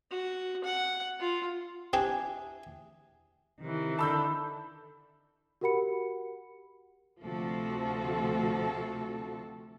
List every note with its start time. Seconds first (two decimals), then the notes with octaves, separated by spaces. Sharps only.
0.11 F#4
0.64 F#5
1.20 F4
1.93 E3 C4 D4 G4 G#4
3.61 C3 D#3 E3
3.99 D3 A5 B5 E6 G6
5.61 F#4 G4 A#4 F#5 B5 C#7
7.23 D2 C3 F3 C4 F#4 A4